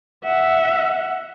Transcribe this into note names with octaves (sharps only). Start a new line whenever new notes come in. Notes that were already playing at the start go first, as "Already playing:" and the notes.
E5 F#5